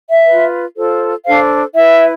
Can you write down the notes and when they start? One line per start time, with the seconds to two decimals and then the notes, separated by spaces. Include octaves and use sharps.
0.10 E5
0.26 F4 B4
0.76 F4 A4 C5
1.25 D4 A4 C5 F5
1.74 E4 B4 E5